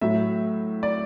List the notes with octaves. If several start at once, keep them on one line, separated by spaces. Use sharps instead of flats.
A2 F#3 E5
D5